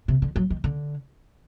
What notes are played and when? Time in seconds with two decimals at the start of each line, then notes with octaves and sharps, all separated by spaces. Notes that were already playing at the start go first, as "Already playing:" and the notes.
0.08 C3
0.22 D3
0.36 F#3
0.50 D#3
0.64 D3